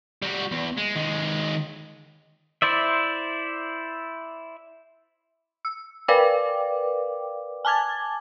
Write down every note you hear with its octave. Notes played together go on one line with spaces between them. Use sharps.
G3 F#4
E2
G#3
D#2 G#3
E4 C5 D5 E5
E6
A#4 B4 D5 F5 G5 D6
G#5 A5 D6 G#6 A6